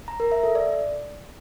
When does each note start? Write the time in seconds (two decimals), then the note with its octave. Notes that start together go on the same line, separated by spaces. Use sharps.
0.08 A#5
0.20 A#4
0.32 E5
0.43 A4
0.55 D5